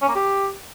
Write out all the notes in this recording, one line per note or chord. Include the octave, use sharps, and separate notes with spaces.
C#4
A#3
G4